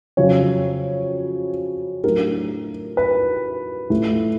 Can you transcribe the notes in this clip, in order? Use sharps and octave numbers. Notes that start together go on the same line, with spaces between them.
F2 C#3 F#3 C#5
A2 F#3 A3 D4 A#4
B4
A2 F3 A3